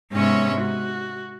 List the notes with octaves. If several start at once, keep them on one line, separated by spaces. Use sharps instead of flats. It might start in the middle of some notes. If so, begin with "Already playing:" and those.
G#2 C3 B3 C#4 C#5 E5
F#4